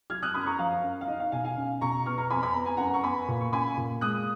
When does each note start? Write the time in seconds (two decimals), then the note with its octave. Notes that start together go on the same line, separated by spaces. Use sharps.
0.10 F#3 F6 G#6
0.22 D#6 F#6
0.34 F#2 B5 D#6
0.46 A#5 C#6
0.59 F3 F5
0.83 F#2
1.01 F5
1.07 D#4 D#5
1.20 F5
1.32 B2 F5 G#5
1.44 F5 G#5
1.57 C#4
1.81 B2 A#5 C#6
2.06 B3 C#6 F6
2.18 A#5 C#6
2.30 F2 G#5 B5
2.43 B5
2.54 B3 A#5
2.66 G#5
2.77 F#2 F#5 A#5
2.94 C#6
3.04 B3 G#5 B5
3.28 A#2
3.41 C#6
3.53 C#4 G#5 B5
3.77 A#2
4.01 G#3 D#6 F#6